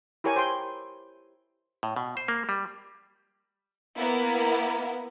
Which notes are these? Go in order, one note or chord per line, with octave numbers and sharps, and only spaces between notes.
E4 G4 A#4 C#5 G#5
C5 G5 C6
A2
B2
C5
A#3
G3
A#3 B3 E4